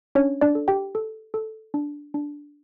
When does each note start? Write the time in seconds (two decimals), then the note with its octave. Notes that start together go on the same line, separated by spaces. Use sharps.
0.15 C#4 D4 C#5
0.41 D4 D5
0.55 A4
0.68 G4 G5
0.95 A4
1.34 A4
1.74 D4
2.14 D4